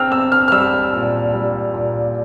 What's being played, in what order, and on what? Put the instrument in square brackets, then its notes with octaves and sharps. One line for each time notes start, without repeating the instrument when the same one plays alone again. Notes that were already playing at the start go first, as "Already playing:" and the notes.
Already playing: [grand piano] C4 E6 F6
C4 E6
F6
F6
G3 E6
A#2
G3
A#2